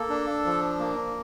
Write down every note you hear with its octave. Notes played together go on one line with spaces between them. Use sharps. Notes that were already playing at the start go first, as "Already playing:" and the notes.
Already playing: A#3 A4
D4
F3
A#3